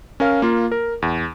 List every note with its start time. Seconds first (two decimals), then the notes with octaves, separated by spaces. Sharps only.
0.20 C#4 A#4 F5
0.42 A#3 F4
0.72 A#4
1.02 E2